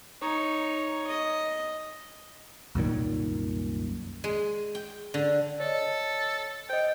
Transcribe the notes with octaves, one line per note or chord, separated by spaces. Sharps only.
D#4 C#5
D#5
C2 F#2 A#2 D#3
G#3
G5
D3
A4 C#5 D#5
C5 D#5 G5